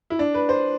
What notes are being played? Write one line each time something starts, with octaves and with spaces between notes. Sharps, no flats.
E4
D4
B4
C5